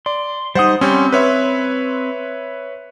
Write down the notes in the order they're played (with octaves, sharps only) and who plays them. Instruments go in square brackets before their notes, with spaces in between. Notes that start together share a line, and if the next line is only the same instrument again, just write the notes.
[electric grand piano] D5 [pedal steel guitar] C6
[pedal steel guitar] G3 D#4 [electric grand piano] C5 F#5 D#6
[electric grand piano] G3 C#4 [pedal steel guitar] C4 C6 G6
[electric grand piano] B4 C#5 E5